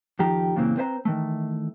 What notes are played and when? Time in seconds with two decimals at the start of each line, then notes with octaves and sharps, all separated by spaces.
0.19 F2 D#3 F3 G4 A#5
0.56 F#2 A#2 C#3 E3 A#3 C4
0.77 C4 B4 C5 E5 A#5
1.05 D#3 E3 A3